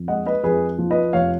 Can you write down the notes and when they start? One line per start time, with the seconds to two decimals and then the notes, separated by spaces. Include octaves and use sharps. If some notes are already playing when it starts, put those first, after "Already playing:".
Already playing: F2
0.08 G#3 D#5 F#5
0.26 B4 D#5
0.43 F2 G#4 B4
0.78 F3
0.91 B4 D#5
1.13 F1 C#5 F5